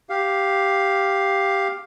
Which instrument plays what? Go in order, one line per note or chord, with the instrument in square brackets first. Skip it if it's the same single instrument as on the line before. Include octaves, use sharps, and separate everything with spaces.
[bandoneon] G4 F5